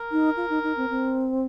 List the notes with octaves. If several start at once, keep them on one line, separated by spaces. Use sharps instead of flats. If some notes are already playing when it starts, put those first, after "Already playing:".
Already playing: A#4
D#4
F4
D#4
D#4
C4
C4